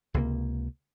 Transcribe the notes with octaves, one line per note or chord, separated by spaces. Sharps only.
C#2 C3 E3 A#3